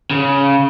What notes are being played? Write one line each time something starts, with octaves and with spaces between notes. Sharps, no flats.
C#3